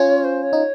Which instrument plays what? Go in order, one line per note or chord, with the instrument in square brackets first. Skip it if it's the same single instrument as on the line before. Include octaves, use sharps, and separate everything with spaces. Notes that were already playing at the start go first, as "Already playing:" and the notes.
Already playing: [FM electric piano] C#4 F4 [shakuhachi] C#5
[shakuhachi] C5
C#5
[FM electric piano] D#4